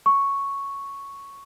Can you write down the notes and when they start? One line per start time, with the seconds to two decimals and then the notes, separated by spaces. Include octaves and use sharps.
0.06 C#6